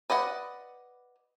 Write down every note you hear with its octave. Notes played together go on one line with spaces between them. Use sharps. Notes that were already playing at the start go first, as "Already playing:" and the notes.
B4 D5 D#5 F#5